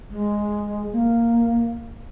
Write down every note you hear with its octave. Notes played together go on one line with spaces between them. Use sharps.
G#3
A#3